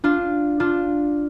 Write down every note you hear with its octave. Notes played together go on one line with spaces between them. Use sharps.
D4 F4
D4 F4